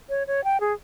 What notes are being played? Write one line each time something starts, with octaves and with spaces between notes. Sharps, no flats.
C#5
C#5
G5
G#4